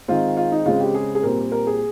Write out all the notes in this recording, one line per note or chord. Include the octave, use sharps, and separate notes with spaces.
D#3 G#3 C4 F4
F4
D#4
C#3 G#3 C4 F4
G4
G#4
G#4
A#2 G3 C4 A#4
A#4
G#4